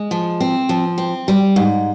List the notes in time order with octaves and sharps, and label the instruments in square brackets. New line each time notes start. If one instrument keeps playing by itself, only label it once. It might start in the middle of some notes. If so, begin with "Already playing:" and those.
Already playing: [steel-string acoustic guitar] G#3
F3
C4
F3
C4
G3
G#2